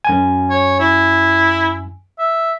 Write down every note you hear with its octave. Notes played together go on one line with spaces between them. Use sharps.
F#2 G#5
C#5
E4
E5